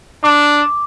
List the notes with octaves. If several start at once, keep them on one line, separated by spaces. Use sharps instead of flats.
D4 D6